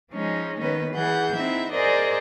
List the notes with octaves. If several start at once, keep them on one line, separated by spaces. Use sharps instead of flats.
F3 G#3 C#4 D#4
D#3 B3 C#4 D#4 B4
E3 G#4 F#5 G6
C4 D#4 E4 E5
G#4 A#4 C5 D5 D#5